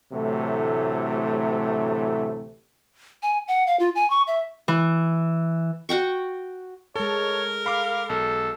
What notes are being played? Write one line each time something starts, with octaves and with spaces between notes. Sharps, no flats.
D2 A2 C3 E3 F#3 A3
G#5
F#5
F5
F4
G#5
C#6
E5
E3
F#4 F#5 G5 C#6
G#3 A4 A#4 C#5 A5
F5 B5 D6
B1 A4